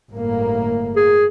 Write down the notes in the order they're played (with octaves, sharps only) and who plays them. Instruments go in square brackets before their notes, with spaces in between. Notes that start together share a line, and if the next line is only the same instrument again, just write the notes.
[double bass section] G1 A2 A#3
[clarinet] G#4